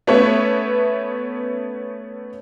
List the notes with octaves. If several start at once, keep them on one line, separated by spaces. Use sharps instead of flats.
A3 B3 C#4 B4 C#5 E5